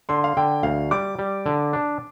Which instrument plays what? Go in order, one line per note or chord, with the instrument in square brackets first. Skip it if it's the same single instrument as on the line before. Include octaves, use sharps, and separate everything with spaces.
[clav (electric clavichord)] D3 [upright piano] C6
[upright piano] F5
[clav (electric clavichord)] D3 [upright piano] G5
[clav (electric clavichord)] D2 [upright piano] F5
[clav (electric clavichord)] G3 [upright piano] D6
[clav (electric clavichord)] G3
D3
D4